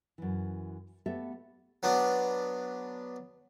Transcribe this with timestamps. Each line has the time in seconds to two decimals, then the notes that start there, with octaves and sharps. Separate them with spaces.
0.18 F#2 E3
1.06 A3 B3 G4 A4 E5
1.83 F#3 B3 D4